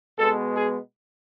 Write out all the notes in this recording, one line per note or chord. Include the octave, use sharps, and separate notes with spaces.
B2 G#3 B3 A4
G#4